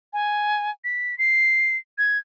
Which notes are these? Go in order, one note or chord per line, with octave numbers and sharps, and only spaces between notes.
G#5
B6
C7
G#6